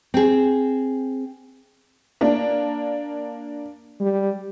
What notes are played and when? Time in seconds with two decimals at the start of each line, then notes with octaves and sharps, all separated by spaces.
0.14 C4 G#4
2.21 A#3 D4
4.01 G3